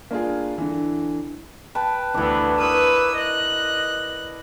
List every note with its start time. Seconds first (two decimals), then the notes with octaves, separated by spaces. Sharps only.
0.11 A#3 D4 F4 G#4
0.58 D3 E3
1.75 B4 G5 A5
2.14 D2 E3 B3 D4 E4
2.58 A#4 B4 C#6 D#6 E6
3.15 D#5 F#6